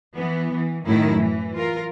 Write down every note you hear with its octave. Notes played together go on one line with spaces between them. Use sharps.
E3 B3
E3
F#2 A2 D#3 A3 E4
E3
F4 A#4